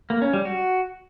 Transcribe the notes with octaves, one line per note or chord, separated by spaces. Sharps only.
A#3
C#4
G3
F#4